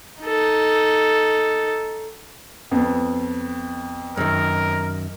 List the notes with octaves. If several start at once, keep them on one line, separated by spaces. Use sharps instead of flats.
D#4 A4
F2 B3
F#2 D#3 A#4